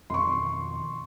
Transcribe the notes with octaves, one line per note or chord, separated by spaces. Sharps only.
F2 B2 D#3 C6 C#6